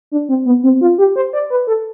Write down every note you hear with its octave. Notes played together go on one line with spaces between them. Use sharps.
D4
C4
B3
C4
F4
G4
C5
D5
B4
A4